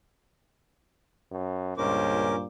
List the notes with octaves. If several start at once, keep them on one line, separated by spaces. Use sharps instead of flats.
F#2
C#2 G2 A#2 C#4 A#4 C5 D6